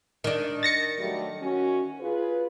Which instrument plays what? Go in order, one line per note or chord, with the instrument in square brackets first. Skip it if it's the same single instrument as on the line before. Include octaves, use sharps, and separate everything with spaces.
[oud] D#3 D4
[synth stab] A6 A#6 C#7
[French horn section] F#3 G3 A3
C#4 F#4
F4 G#4 B4